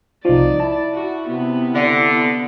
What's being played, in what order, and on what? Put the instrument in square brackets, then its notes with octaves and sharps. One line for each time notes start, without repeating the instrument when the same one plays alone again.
[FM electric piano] C2 F3 [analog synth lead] D#4 [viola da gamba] D5
[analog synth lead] E4 [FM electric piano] A5
[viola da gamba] F#4
C3 B3
[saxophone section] D3
[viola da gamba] B3